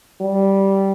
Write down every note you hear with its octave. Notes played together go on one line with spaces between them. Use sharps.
G3